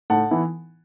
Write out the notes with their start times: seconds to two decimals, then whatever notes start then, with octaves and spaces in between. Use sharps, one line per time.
0.10 A2 F#5 A5
0.31 E3 B3 E4